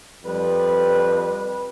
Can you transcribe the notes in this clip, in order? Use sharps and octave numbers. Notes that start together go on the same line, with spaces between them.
F2 G3 B4